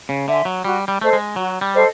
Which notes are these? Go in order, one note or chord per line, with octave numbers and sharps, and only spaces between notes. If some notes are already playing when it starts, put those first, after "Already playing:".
C#3
D3 E5 G#5 C6
F#3
G3 F#4
G3
A3 A4 C5 D#5
G#3
F#3 F#4
G3
A4 C5 D#5